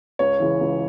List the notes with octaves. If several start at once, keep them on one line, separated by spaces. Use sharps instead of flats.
C#2 C#5
C#3 E3
C#2